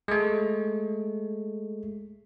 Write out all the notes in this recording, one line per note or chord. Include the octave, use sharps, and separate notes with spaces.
G#3 A3